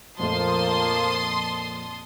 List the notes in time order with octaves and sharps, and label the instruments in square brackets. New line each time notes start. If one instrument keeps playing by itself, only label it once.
[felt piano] F2 A#2 A3 [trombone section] F3 [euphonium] A#3 [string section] A5 C6 D#6